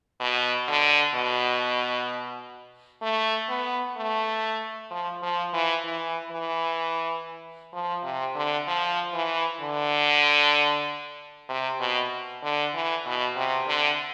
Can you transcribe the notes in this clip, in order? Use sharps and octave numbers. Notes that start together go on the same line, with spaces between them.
B2
D3
B2
A3
B3
A3
F3
F3
E3
E3
E3
F3
C3
D3
F3
E3
D3
C3
B2
D3
E3
B2
C3
D3